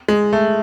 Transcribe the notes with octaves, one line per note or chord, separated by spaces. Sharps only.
G#3
A3